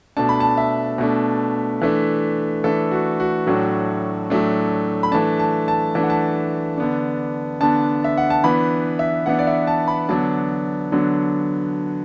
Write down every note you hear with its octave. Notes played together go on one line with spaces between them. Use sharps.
B2 A3 D4 A5
B5
A5
E5
B2 A3 D4
E3 A3 D4
E3 A3 D4 A4
F#4
F#4
A2 F#3 A3 D4
A2 F#3 A3 D4
B5
E3 A3 D4 A5
A5
A5
E3 A3 D4 A5
F#5
A5
D3 B3 D4
D3 B3 D4 A5
E5
F#5
A5
E3 B3 D4 B5
E5
E3 B3 D4 F#5
D5
E5
A5
B5
D3 F#3 B3 D4 A5
D3 F#3 B3 D4